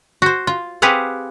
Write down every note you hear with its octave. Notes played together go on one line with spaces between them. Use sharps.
F#4 C5
F4
C4 G4 G#4 B4 F5 F#5